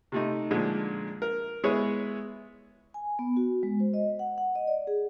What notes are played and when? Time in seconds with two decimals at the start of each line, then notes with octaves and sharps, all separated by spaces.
0.12 C3 A3 D#4
0.51 A#2 D3 F3 G#3
1.22 A#4
1.64 G#3 B3 E4 G#4 C#5
2.94 G#5
3.19 B3
3.37 F#4
3.63 G#3
3.80 C5
3.94 D#5
4.19 F#5
4.38 F#5
4.55 D#5
4.67 D5
4.87 G#4